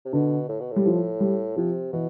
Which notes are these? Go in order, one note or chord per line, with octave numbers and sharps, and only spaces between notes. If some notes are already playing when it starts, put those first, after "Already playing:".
C3
B2 D3
A2
B2
A2 G3
F3
G3
C3 F3
B2 E3